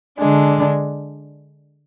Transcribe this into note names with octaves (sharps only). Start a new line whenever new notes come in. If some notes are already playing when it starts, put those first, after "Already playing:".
D3 G#3 D4